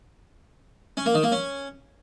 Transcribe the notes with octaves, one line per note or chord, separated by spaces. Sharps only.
C#4
A#3
D#3
A#3
C#4